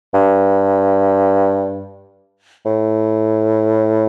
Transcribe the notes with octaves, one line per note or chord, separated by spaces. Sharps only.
G2
A2